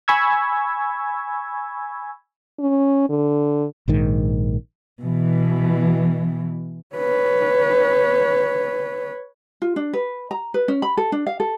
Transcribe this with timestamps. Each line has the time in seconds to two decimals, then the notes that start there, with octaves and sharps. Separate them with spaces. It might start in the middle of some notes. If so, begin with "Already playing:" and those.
0.08 G#5 B5 C#6 E6 G#6
2.60 C#4
3.10 D3
3.88 A#1 G#2 D#3
5.02 B2 E3
6.96 B4 C#5
9.62 F4
9.76 D4
9.93 B4
10.31 A#5
10.54 B4
10.68 C#4
10.82 B5
10.97 A4
11.12 D4
11.27 F5
11.40 A4